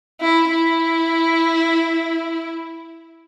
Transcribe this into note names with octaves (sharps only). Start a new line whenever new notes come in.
E4
E4